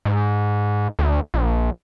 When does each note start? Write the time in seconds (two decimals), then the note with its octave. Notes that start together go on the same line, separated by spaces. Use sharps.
0.05 G#2
0.99 D2
1.34 A#1